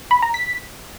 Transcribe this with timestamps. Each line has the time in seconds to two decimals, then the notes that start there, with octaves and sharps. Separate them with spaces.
0.11 B5
0.22 A#5
0.34 B6